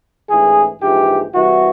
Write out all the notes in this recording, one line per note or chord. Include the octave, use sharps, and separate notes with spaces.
A1 G#2 E3 G#4
A#1 G#2 E3 G4
C2 C3 E3 F#4